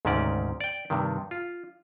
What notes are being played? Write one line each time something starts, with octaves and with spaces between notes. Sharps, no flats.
D2 G#2 C3 D#3 C#4 D5
D5 G5
G2 C3 D#3
F4